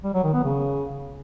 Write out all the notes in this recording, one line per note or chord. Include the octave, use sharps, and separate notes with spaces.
G3
F#3
D#3
B3
C#3